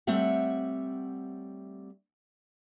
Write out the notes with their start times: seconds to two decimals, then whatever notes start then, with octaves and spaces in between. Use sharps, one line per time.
0.07 G3 A3 C4 C#5 E5 F#5